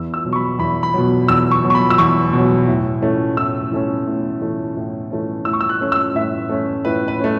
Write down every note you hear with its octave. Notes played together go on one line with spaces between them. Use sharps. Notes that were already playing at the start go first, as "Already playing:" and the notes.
Already playing: E2 E6
E6
B2 F#3
C#6
B5
E2 B5
B5
B2 F#3
E2 E6
C#6
B2 F#3
C#6
B5
E6
E2 C#6
B2 F#3
A2
E3 A3 C#4
A2 E6
E3 A3 C#4
A2
E3 A3 C#4
A2
E3 A3 C#4
A2 E6
C#6
E6
F#6
A3 C#4
E6
A2 E5
A3 C#4
A2 B4
B4
A3 C#4